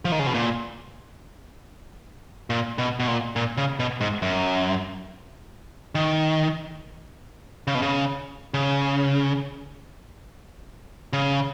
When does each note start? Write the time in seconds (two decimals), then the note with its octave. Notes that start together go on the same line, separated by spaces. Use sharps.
0.05 F3
0.12 D#3
0.19 C#3
0.27 B2
0.34 A#2
2.50 A#2
2.78 B2
3.00 B2
3.08 A#2
3.36 A#2
3.58 C#3
3.79 B2
4.01 G#2
4.22 F#2
5.95 D#3
7.67 C#3
7.75 B2
7.82 C#3
8.54 C#3
11.13 C#3